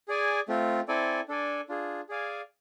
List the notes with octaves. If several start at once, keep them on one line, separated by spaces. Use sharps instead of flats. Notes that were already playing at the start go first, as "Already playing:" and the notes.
G#4 D5 G#5
A3 C4 F4
C4 E4 A4 D5 G#5
D4 A4 D5 G#5
D4 F4 G#4
G#4 D5 F5 G#5